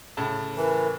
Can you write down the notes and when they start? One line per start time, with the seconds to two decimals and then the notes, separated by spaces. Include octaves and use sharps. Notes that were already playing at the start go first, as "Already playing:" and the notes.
0.17 A2 C#3 A5
0.57 E3 A#4